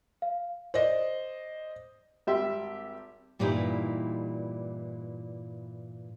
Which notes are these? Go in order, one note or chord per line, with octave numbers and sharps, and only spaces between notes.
F5
C5 D5 D#5
G#1 G3 G4 E5 C6 E6
G2 A#2 E3 G3 D#4 E4